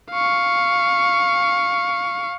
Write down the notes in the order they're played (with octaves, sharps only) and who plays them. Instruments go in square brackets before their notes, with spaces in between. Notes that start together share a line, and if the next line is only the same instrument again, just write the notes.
[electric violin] F5 C#6